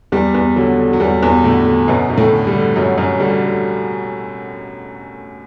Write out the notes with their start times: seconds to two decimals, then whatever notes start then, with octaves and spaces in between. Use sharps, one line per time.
0.12 E2 G3
0.34 E2
0.56 D3 F#3
0.78 D3
0.93 F#3
1.00 E2 G3
1.23 E2
1.44 A2 D3 A3
1.66 D3
1.88 F#2 B2 B3
2.10 F#2
2.18 A2 A3
2.32 D3
2.47 G3
2.55 D3
2.76 F#2 F#3
2.98 F#2
3.20 D3 G3
3.43 D3